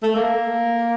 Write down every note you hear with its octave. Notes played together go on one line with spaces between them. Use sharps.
A3
A#3